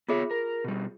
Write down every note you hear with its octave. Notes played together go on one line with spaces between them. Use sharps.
B3 F4 G#4 C#5 E5
A#4
B2 G3